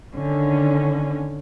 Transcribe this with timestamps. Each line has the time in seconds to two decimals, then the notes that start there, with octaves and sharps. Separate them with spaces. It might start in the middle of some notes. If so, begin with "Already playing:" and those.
0.15 D3 D#3 C#4